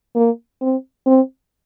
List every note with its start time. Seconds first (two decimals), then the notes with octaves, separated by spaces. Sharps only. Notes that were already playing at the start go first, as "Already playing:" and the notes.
0.16 A#3
0.61 C4
1.07 C4